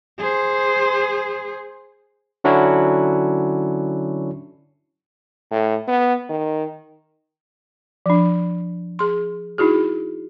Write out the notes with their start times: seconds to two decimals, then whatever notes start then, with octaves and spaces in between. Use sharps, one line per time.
0.18 G#4 C5
2.44 D3 F#3 C#4 D4 E4 F#4
5.51 A2
5.88 B3
6.30 D#3
8.06 F3 D4
8.99 G#4 C6
9.58 D#4 E4 F#4 G#4